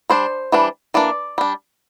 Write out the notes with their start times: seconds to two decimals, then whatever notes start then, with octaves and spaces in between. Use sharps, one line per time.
0.10 G3 D4 C5
0.52 E3 G3 D4
0.94 E3 A#3 D4 D5
1.38 G3 D4